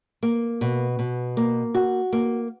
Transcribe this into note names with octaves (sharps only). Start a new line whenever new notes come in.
A#3
B2
B2
A#3
F#4
A#3